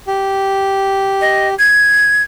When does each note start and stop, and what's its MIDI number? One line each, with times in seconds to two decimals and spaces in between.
0.08 1.54 67
1.21 1.48 75
1.59 2.23 92